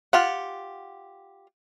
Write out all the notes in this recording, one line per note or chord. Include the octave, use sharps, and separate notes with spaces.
F4 G4 F#5